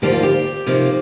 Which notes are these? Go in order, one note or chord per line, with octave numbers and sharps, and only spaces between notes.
D2 D3 F3 A#3 D#4 G4
F4
G4
C3 F3 A#3 D#4